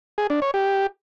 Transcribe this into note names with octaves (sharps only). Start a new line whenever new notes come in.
G#4
D4
C#5
G4